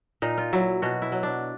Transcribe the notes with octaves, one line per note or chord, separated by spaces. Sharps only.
A#2 D#4
F4
F#3 E4
B2 F#4
E4
F#3
D4